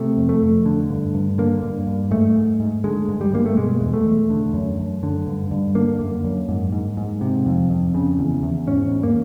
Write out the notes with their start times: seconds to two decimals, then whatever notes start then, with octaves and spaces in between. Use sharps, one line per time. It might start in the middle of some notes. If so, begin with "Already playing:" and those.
Already playing: C3 A3
0.17 F2
0.29 A3
0.42 F2
0.66 D3
0.90 G2
1.14 G2
1.38 D3 A#3
1.63 G2
1.87 G2
2.11 G#2 A3
2.36 G#2
2.60 G#2
2.84 D3 G#3
3.08 G2
3.21 G3
3.33 G2 A#3
3.46 A3
3.57 B2 G#3
3.81 E2
3.94 A3
4.05 E2
4.30 D3
4.54 F#2
4.78 F#2
5.03 D3
5.27 G2
5.51 G2
5.75 D3 A#3
6.00 F#2
6.24 F#2
6.49 G#2
6.72 G#2
6.97 G#2
7.21 C3
7.46 F2
7.70 F2
7.94 C#3
8.19 E2
8.43 E2
8.67 G#2 C#4
8.91 G#2
9.03 A#3